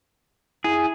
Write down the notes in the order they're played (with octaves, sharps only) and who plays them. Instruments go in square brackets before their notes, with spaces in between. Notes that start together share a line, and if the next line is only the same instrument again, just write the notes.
[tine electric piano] E4 [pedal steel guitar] G#4